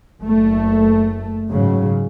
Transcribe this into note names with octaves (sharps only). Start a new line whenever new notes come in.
F#1 A3
G#2 C#3 F#3